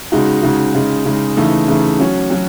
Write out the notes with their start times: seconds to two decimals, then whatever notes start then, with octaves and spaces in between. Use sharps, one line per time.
0.12 C#3 G#3 D#4 F#4
0.43 C#3 G#3 D#4 F#4
0.74 C#3 G#3 D#4
1.06 C#3 G#3 D#4
1.37 C#3 E3 A3 D#4
1.68 C#3 E3 A3 D#4
1.99 F#3 C#4 F#4
2.30 F#3 C#4 F#4